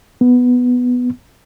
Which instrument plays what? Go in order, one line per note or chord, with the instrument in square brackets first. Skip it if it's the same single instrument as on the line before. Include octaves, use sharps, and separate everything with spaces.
[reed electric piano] B3